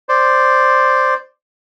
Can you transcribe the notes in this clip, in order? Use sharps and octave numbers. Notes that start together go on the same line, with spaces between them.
C5 D5